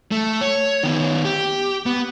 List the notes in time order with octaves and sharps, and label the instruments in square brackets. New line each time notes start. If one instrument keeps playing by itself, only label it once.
[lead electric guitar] A3
C#5
D#3 B3
G4
B3